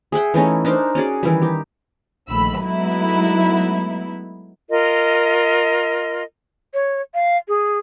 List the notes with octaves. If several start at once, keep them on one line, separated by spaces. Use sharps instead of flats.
G#4 E5 F#5 G5
E3 A3 C#4 D#4
D4 D#4 A#4 C5
C#4 F#4 G#4 D5
D#3 E3 G3
D#4 G4
A#1 D#3 A3 B5 E6
F#3 G#3 A3 B3 D#4 E4
F4 A#4 D#5
C#5
F5
G#4